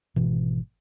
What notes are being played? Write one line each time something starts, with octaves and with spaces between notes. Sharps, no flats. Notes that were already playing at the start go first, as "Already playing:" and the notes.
G#1 B2 E3